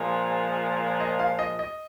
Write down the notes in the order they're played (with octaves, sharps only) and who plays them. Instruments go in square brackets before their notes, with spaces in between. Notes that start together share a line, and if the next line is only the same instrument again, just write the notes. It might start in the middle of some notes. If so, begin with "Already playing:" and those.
Already playing: [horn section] A#2 F3 G#3
[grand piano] D#5
F5
D#5
D#5